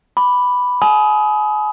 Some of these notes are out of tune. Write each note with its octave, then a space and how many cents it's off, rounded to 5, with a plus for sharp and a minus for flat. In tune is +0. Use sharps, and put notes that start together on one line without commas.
B5 +0 D6 +5
G#5 +35 B5 +0 D#6 +20